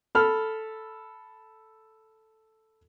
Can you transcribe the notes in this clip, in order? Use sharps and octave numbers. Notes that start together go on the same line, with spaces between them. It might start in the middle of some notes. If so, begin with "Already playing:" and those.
A4 B5 F6